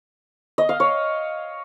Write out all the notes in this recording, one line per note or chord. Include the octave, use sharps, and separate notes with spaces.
D#5
F5
C#5